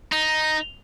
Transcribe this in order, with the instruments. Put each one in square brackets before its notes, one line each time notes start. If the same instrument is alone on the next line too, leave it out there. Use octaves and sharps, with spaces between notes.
[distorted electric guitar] D#4